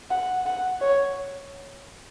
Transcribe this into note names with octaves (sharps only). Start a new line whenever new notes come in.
F#5
F#5
C#5